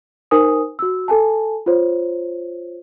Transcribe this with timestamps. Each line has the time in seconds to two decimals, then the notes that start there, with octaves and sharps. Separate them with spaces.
0.31 D#4 A#4 C5 G#5 D#6
0.79 F#4 E6
1.08 A4 G#5 A5
1.66 F4 C5 C#5